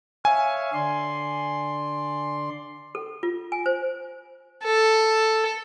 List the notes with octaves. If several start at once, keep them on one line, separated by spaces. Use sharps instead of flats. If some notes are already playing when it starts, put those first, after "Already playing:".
C#5 E5 F5 G#5
D3 D5 C6
A4
F4
G#5
C5
A4